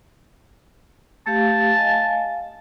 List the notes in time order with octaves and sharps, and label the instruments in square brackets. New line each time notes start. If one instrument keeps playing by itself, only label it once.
[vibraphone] A3 G4 F5 [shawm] A5
[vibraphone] D#5 F5 G#5